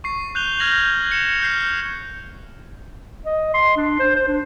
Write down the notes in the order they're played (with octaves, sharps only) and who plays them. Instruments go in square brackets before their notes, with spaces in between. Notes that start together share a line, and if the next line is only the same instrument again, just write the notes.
[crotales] C#6 C7
F#6 G6 F7 G7
F6 G6 G#6 A#6 F7 F#7
C#7 E7 F7
F6 G6 C7
[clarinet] D#5
C6
D4
C5
C5
D4